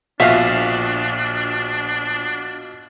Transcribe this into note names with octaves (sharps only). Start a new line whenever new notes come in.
A#1 B2 D4 F4 F#4 E5 F5